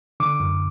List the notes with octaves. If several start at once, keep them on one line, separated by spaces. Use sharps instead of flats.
D3 D6
F#2